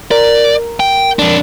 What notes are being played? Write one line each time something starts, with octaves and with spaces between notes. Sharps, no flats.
A#4 D5
G5
F2 D4